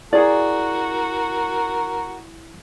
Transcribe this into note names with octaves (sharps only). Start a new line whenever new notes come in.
E4 F#4 G#4 A#4 D5